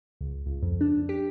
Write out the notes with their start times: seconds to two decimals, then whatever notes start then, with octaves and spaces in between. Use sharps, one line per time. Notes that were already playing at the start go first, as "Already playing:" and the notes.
0.21 C#2
0.46 C#2
0.62 F2
0.81 D4
1.09 G4